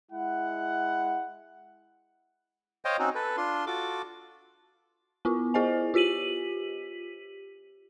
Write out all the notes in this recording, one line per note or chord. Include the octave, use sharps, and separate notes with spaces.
G#3 E4 F#5
C5 C#5 D#5 F5 G5
C4 C#4 D#4 F#4
A4 B4
D4 F4 C6
F4 F#4 A4 D6
B3 E4 F4
E4 G#4 C5 D#5 G#5
F4 G4 B6 D#7 F#7